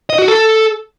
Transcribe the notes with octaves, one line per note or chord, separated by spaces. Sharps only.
D#5
F#4
A4